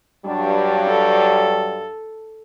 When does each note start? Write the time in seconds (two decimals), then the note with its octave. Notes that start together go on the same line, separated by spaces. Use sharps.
0.26 G2 F#3 G3 D4
0.88 A4